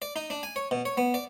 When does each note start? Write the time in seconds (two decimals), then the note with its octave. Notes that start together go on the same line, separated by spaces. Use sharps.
0.02 D5
0.16 D#4
0.30 D4
0.43 G#5
0.56 C#5
0.71 B2
0.85 C#5
0.97 B3
1.14 D5